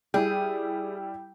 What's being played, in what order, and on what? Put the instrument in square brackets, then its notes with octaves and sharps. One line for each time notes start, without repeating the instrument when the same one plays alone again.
[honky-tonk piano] G3 E4 [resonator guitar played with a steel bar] G#4 [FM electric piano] G5